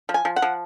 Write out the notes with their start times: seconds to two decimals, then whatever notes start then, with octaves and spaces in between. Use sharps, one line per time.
0.09 F3
0.14 G#5
0.25 F3
0.36 F#5
0.42 F3